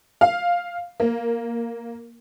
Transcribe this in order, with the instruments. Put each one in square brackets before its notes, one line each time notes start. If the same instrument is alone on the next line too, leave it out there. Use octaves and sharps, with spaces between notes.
[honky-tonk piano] F5
A#3